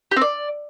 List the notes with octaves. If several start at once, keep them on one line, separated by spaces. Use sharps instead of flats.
G4
C4
D5